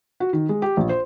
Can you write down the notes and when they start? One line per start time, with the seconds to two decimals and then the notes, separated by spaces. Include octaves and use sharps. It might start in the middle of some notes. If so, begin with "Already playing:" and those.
0.20 F#4
0.33 D#3
0.49 G#3
0.62 G4
0.77 A#1
0.89 C5